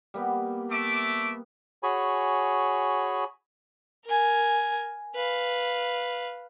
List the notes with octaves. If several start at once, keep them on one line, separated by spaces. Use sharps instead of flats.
G3 A#3 B3
A3 E5 D6
F#4 G#4 C#5 G#5 B5
A#4 G#5
B4 F5